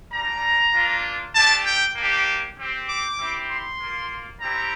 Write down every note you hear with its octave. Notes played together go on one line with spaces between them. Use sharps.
G3 D4 F4 A#5
A#3 D4 F4
A3 D4 G4 A5
G5
A#3 D4 G4
C4 G4
D6
C4 E4 G4
C6
A#3 F4
G3 C4 E4 G4 A#5